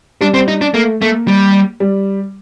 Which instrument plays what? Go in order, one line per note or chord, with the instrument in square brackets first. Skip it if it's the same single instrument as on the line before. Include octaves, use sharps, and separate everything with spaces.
[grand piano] G3 [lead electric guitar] D4
[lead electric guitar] C4
D#4
D4
[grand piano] A3 [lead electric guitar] A#3
[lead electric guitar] A3 [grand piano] A#3
[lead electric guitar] G3
[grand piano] G3